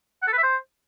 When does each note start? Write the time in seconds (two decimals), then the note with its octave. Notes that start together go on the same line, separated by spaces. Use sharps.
0.22 F#5
0.27 A4
0.33 B4
0.38 E5
0.43 C5